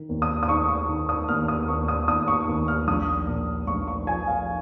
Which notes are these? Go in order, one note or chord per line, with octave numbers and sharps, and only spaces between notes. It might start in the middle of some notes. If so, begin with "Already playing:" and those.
Already playing: D#3
D#2
D#6
D#6
D#3 C#6
C#6
D#3
D#6
D#2 F6
D#6
D#2 C#6
D#6
D#2 D#6
C#6
D#2
F6
A#1 D#6
A#2
A#1 C#6
C#6
F3 G#5
F5